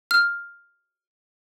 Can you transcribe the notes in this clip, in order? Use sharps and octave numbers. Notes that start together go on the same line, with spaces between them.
F6